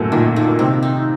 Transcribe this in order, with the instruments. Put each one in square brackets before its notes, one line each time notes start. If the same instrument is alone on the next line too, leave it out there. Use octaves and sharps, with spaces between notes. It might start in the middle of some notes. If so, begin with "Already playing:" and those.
Already playing: [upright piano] F#2 A2 F#3 A3 A#3
[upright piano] A#2 A#3 [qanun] D#3
[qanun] D#3
[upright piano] A#3
[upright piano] C3 C4 [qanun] D#3
[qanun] D#4